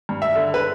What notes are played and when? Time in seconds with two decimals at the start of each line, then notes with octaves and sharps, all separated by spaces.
0.09 G2
0.22 E5
0.35 D3
0.54 B4